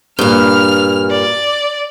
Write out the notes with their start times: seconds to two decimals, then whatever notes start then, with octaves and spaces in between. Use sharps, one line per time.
0.19 G2 A#2 F6
1.10 D5